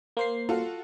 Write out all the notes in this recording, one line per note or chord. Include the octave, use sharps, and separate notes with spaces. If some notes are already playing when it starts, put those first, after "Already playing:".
A#3 C5 C7
F4 F#4 A4